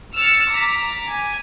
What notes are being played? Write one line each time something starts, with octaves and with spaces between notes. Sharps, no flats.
E6 F6 A6 C#7
A#5 D6 B6
G#5